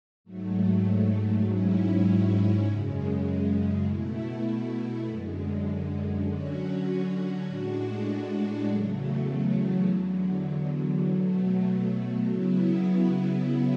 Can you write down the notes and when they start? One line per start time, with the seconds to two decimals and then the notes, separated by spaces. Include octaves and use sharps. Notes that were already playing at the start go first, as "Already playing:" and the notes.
0.24 G#2 F#3 A3
1.45 G#2 F#3 C#4 E4
2.65 F#2 C#3 G#3
3.86 B2 A3 E4
5.06 F#2 D3 G#3
6.26 D3 F#3 C#4 F#4
7.47 A2 G#3 D4 F#4
8.67 E2 C#3 F#3 A3
9.88 E2 D3 F#3
11.07 B2 F#3 A3
12.28 C#3 F#3 B3 E4